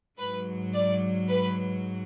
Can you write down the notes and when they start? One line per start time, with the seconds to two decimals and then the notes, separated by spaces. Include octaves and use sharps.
0.19 G#2 F#3 B4
0.74 D5
1.29 B4